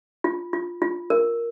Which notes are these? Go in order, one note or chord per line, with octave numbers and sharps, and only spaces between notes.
F4
F4
F4
A#4